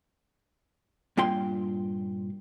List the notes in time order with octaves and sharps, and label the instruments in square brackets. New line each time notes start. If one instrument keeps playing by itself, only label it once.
[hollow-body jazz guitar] G2 A#2 F4 G5 C6